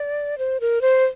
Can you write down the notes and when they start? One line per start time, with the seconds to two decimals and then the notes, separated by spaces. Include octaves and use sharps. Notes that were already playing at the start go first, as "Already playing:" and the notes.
Already playing: D5
0.38 C5
0.60 A#4
0.81 C5